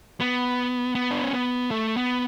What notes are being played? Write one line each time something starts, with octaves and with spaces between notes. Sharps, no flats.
B3
B3
D4
C#4
B3
A3
B3